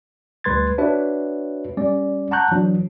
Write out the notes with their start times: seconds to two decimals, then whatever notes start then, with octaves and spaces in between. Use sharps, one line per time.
0.44 D2 G3 B4 C6 G#6 A6
0.78 D4 F#4 B4 C#5 E5
1.77 G3 C#4 D5
2.31 F#5 A5 A#5 C#6 F#6 G6
2.51 E3 F#3 D4